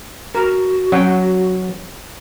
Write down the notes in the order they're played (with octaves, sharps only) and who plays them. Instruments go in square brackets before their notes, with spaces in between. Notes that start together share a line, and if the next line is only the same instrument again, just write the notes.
[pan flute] F#4 [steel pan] A#4
[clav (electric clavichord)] F#3 [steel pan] C#4 F#5 G5